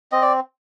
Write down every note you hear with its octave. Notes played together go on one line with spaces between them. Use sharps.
C4 D#5
D5